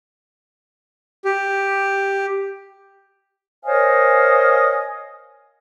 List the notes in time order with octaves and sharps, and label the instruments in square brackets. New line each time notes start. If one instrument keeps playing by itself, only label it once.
[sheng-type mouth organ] G4
[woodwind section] A#4 C5 C#5 D#5 F5 G#5